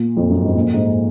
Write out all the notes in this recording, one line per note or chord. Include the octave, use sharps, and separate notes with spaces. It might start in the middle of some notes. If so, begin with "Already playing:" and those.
Already playing: A#2
F2
F#2
G#2
A#2
G#2